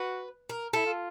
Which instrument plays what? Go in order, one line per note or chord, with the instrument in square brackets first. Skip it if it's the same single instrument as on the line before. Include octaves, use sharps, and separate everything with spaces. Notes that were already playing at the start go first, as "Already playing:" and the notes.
Already playing: [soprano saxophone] F#4 [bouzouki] B4
[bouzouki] A#4
[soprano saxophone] E4 [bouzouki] A4
[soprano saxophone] F4